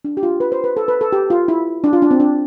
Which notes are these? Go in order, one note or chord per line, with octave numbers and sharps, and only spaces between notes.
D4
G4
F4
B4
C5
B4
A4
B4
A4
G4
F4
E4
D4
F4
D4
C4
D4